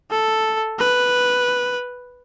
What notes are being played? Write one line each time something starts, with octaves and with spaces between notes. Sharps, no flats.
A4
B4